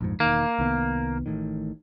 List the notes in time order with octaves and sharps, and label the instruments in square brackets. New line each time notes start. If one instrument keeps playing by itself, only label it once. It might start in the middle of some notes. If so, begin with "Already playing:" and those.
[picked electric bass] A#1 F2 G#2
[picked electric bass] E1 D#3 [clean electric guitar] A#3
[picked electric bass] C2 D#3 B3
A1 A2 D#3